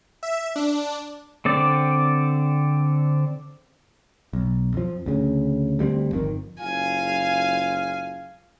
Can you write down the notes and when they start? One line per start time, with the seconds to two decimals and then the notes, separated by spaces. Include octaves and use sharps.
0.23 E5
0.56 D4
1.45 D3 C4 D5
4.33 B1
4.74 F2 F3
5.06 D2 C#3
5.79 D2 G3 G#3 C4
6.11 G1 F2 A2 D#3
6.60 F#1 F4 F5 G#5